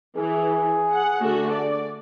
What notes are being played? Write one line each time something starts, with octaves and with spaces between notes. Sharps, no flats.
E3 G#4
F#5
D3 A3 F#4
D5